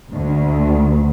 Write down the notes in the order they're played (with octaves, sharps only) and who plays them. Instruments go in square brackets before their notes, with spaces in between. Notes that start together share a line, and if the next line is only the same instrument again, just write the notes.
[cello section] D2